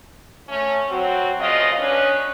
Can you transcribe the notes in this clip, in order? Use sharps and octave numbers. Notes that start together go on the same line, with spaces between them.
A3 C#4
F#3 C4 F#4
D2 C#3 F4 D#5
C#4 D4 B4